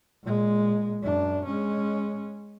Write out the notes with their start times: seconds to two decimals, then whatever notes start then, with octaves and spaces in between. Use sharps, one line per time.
0.24 A#2 G#3
1.03 F#2 D4
1.45 G#3 C#4